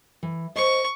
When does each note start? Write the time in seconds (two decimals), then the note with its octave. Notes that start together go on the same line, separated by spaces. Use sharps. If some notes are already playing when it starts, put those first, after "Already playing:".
0.23 E3
0.56 C5 D#5 C#6